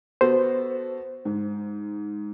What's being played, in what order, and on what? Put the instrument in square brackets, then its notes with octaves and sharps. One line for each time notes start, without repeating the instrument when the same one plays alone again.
[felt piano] B3 F#4 A4 [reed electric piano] C5
[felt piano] G#2